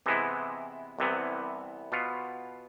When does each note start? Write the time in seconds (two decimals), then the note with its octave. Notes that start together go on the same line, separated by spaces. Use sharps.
0.06 C3 E3 G#3 B3 E4
0.99 C2 C3 E3 B3
1.92 B2 B3 F4